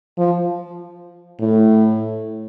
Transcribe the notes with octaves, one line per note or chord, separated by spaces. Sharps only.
F3
A2